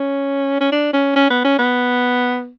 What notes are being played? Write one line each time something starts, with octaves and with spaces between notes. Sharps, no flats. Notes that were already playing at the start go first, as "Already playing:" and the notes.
Already playing: C#4
C#4
D4
C#4
C#4
B3
C#4
B3